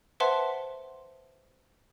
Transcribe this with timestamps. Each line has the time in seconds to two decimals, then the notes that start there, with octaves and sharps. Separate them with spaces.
0.20 B4 C5 E5 F#5 A5 C6